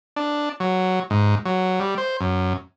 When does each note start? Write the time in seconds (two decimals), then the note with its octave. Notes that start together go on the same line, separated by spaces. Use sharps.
0.16 D4
0.60 F#3
1.10 G#2
1.45 F#3
1.80 G3
1.98 C5
2.21 F#2